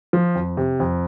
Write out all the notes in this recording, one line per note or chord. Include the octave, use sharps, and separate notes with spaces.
F3
F2
C3
F2